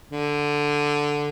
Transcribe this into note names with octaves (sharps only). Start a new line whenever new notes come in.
D3